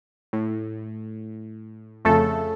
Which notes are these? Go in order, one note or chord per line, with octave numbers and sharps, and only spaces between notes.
A2
F2 C#3 A3 A4